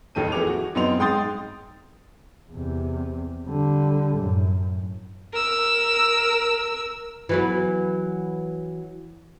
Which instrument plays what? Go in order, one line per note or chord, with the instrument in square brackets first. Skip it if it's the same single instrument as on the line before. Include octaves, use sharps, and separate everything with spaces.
[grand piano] A1 D#2 D#3 A4 D#7
F2 E3 G#4 D6 F7
F#4
F#2 B3 C4 D#4 C6 F7
G#2 G5 C6 D#6 A6
[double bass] E2 C3
D3 G3
F#2 A2
[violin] A#4 E6
[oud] E3 F#3 B3